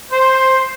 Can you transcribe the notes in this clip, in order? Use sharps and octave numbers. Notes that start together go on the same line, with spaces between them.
C5